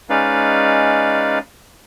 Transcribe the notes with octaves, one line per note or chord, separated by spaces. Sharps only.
G#3 C#4 D#4 B4 D5 F5